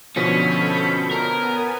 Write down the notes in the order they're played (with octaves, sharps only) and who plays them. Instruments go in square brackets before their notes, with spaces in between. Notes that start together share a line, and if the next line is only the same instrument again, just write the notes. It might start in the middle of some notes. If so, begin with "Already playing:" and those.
[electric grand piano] B2 D3 F3 [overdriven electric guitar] C#4 [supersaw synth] A4 B5 G6 [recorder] B6
[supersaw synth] B3 G#5 [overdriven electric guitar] A#4 [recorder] C#5